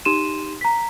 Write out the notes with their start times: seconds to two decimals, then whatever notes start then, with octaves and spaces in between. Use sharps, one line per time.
0.05 D#4 G4 C6 D#7 E7
0.61 A#5 B6